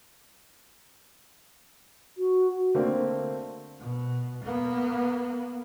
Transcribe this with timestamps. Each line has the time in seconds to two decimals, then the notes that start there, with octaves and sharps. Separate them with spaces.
2.18 F#4
2.74 D3 A3 A#3 C4 D4
3.80 B2
4.45 A#3 B3